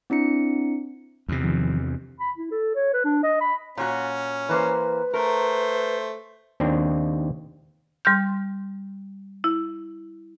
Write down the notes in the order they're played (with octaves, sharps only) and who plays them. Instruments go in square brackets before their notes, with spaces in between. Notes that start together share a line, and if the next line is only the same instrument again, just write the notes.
[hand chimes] C4 D4 E4 C#7
[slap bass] E2 C3
[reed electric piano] D#3 F3
[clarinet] B5
E4
A4
C#5
B4
D4
D#5
B5
[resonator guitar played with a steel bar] A#2 F#4 [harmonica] C#4
[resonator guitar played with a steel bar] E3 A#3 C5 [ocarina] B4
[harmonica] A3 C5 [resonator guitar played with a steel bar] A#4
[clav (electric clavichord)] D#2 C4 D4
[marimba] G3 C6 F6 G6
E4